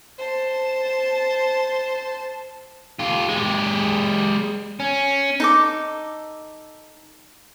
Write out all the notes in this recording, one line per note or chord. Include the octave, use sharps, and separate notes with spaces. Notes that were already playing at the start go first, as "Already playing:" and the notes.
C5 A5
F4 G4
G#3 G4
C#4
D#4 A4 D6